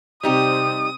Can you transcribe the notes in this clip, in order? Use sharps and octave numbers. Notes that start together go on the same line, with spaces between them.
C3 G3 C4 D#4 G4 D#6